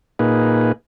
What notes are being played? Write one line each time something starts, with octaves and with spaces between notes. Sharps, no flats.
A#2 A#3 D#4 G#4 B4